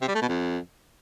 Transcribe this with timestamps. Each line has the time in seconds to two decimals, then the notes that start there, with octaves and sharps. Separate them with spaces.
0.01 C3
0.08 G3
0.15 A3
0.22 B2
0.28 F2